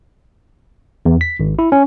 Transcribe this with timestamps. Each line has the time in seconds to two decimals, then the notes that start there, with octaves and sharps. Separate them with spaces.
1.05 E2
1.21 B6
1.40 G#1
1.59 E4
1.72 C#4